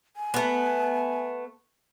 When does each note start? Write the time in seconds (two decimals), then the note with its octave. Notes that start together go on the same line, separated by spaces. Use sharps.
0.17 G#5
0.34 A3 B3